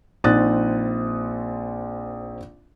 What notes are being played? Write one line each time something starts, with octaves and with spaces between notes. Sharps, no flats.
A#1 C4 D#4 D#6 F#6 A6